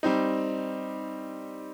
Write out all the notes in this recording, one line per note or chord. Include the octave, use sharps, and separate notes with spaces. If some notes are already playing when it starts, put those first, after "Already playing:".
G3 C4 D#4